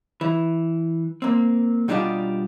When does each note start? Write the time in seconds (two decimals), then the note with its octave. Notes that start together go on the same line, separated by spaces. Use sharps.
0.21 E3
1.22 A#3 C4
1.88 B2 G3 D4 D#4 F4 G4